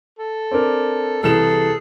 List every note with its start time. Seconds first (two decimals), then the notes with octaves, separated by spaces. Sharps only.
0.19 A4
0.51 C4 D4 A#4
1.23 C2 E3 G#4 A4 E7